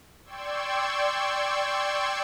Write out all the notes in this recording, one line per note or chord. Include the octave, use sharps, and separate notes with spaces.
D5 G5 C6 C#6 E6 G#6